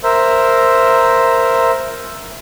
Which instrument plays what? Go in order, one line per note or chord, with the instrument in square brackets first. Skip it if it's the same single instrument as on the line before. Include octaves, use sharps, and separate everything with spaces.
[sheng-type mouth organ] A#4 C5 E5